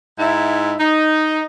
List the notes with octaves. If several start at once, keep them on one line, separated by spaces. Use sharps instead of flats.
G#2 D#4 E4
D#4